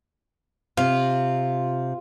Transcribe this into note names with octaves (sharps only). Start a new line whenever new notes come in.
C3 F4